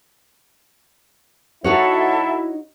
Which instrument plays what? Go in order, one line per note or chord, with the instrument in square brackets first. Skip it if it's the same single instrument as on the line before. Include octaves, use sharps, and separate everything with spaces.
[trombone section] F#3 E4 [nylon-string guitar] D#4 F#4 C#5 [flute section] A4 E5